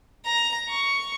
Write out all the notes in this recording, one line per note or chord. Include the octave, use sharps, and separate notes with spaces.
A#5
C#6